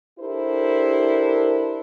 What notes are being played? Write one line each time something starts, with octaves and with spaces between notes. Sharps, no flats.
D4 E4 G4 A4 A#4 C5